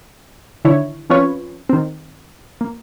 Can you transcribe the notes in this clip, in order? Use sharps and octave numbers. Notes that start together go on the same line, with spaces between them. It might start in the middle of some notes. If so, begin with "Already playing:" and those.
D3 D#3 E4 C#5
F3 C4 C#4 F4 B4 C#5
D#3 C4
A#3